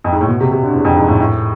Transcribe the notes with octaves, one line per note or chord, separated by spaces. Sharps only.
F2
G#2
A2
B2
C3
C3
D3
E2
F2
G#2
A2
A2